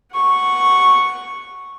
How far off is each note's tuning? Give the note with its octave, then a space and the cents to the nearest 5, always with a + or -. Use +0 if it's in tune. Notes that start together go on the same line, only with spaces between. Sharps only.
F#5 +0 C#6 -5